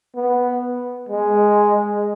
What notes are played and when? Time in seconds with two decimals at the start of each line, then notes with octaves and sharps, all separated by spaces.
0.16 B3
1.09 G#3